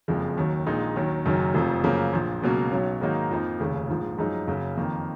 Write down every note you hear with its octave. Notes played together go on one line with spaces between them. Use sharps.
F#1 F2 F3 G#3
D#2 D#3 F#3
A#1 A#2 G#3 D#4
D#2 D#3 F#3
F#1 F#2 D#3 F#3
F1 F2 F3
F#2 C#3 F3 A#3
A#1 A#2 F3
C#2 B2 F#3 A#3 C#4
B1 B2 F#3 C#4
G#2 D#3 F#3 A#3 D#4
F2 F3 A#3 D#4
F1 D#2 C#3
A#1 G#2 F3
F#2 F3 G#3 D#4
F#1 F#2 C#3
F2 D#3 A#3